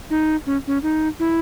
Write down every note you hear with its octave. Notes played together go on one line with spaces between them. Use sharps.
D#4
C#4
C#4
D#4
E4